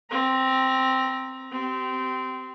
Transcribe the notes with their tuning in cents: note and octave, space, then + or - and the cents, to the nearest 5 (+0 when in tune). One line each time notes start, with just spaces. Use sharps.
C4 +0 A#5 +30
C4 -20 G4 -25